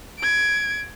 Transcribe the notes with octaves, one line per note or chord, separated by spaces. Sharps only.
G#6 D7